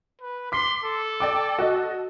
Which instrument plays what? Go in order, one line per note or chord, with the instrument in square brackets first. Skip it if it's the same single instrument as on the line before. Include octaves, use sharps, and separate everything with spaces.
[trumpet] B4
[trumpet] C6 [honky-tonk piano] D6 B6
[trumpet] A4
[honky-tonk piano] D5 G5 D6
F#4 D#5